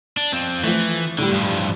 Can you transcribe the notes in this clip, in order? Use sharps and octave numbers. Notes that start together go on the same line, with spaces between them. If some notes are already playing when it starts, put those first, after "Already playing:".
D4
F2 C4
E3 F3 A3
A2 D3 G3
G2 F3